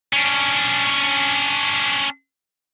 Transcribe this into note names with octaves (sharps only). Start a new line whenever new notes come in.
C#4 D4